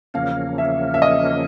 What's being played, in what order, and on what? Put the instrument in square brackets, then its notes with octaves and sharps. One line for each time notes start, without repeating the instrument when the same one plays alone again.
[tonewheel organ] E2 C#3 F3 A#3 C#4 [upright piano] F5
[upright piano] E5
E5
D#5